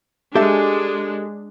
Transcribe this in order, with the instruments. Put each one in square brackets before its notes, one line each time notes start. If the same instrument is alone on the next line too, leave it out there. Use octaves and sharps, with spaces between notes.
[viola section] G#3 D4 [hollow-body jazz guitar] G4 A4 E5